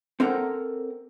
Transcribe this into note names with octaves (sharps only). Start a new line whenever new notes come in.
C4 A4 A#4 F#5 A#5